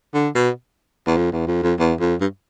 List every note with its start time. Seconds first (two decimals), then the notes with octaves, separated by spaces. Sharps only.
0.14 D3
0.35 B2
1.07 E2
1.17 F2
1.32 E2
1.47 F2
1.63 F2
1.79 E2
2.00 F2
2.20 G2